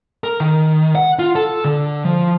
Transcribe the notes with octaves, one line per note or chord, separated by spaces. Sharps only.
A#4
D#3
F#5
F4
A4
D3
F3